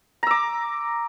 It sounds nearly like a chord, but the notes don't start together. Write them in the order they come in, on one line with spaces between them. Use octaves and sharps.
A#5 E6 D6